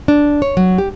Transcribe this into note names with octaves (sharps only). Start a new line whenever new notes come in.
D4
C#5
F#3
G4